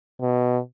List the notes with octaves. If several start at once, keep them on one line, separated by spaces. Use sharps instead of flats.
B2